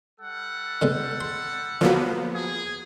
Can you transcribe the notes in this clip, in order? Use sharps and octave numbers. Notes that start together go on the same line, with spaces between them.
G3 A4 F#5
D3 G#3 B3
C6
D3 F3 F#3 A#3 B3
G#4